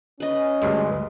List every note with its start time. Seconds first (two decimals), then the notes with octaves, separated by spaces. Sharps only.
0.20 C#4 B4 D#5
0.62 D2 G2 G#3